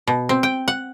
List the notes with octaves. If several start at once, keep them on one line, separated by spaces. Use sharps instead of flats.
B2
C4
G5
F#5